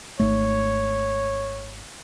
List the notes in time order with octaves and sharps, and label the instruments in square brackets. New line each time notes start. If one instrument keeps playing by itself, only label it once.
[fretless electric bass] G#1 G#2 A3 [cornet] C#5